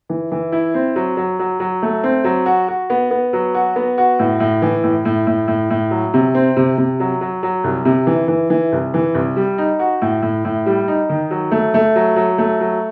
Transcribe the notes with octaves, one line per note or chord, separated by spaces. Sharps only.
E3
E3
E4
C4
F#3
F#3
F#3
F#3
A3
C4
F#3
F#4
F#4
B3
B3
F#3
F#4
B3
F#4
A2
A2
E3
A2
A2
A2
A2
A2
F#3
C3
C4
C3
C3
F#3
F#3
F#3
C2
C3
E3
E3
E3
C2
E3
C2
G3
D#4
F#4
A2
A2
A2
G3
D#4
D#3
F#3
A3
A3
F#3
F#3
A3
F#3